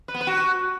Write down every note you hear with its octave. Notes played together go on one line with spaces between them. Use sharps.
B4
B3
B4
F#4